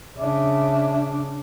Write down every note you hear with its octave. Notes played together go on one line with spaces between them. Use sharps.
C#3 D4 E5